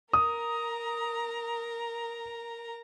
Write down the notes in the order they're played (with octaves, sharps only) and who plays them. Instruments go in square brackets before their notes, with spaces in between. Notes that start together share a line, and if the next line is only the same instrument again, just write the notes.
[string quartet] A#4 A#5 [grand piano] D#6